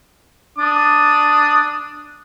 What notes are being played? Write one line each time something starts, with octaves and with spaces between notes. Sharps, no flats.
D4 D#6